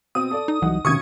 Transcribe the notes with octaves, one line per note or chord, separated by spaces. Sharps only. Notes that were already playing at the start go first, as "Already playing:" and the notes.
B2 C4 D#6
A4 D5
D#4
C2 E3 F#3 D#4 F#5
E1 B1 C3 D#3 C#4 C#6 D#6 G#6